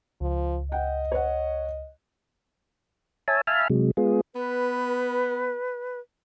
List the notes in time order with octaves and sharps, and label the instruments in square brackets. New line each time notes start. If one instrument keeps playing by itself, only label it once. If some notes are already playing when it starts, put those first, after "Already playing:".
[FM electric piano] C#2 [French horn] F3
[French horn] D#5 [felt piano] F#5 G5
[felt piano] C#5 F#5
[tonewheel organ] C#5 E5 G#5 A5
E5 F5 G#5 A5 B5 F6
C3 F#3 G#3
G#3 B3 F4 G#4
[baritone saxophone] B3 [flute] B4